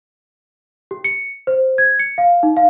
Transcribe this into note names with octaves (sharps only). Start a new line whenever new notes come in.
G4
C#7
C5
G#6
C#7
F5
D#4
F5